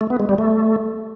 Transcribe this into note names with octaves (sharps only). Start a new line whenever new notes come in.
A3
B3
G#3
G3
A3